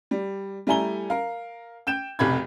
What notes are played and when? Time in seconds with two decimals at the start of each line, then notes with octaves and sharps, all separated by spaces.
0.11 G3
0.67 G3 A3 E4 G#5 A#5 G7
1.10 A#4 F5
1.87 G5 G6 E7
2.19 F1 B1 C3 G4 B5 G#6